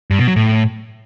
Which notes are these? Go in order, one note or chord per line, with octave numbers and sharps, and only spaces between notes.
G2
B2
F#3
A2